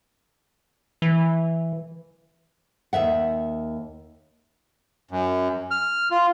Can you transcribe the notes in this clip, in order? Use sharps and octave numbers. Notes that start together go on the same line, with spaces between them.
E3
D#2 D#3 E5 F#5
F#2
F6
F4